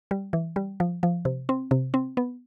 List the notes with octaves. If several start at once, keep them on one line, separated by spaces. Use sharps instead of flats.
G3
E3
G3
F3
F3
C3
C4
C3
C4
B3